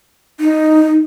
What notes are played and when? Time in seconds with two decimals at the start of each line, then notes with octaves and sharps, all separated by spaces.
0.40 D#4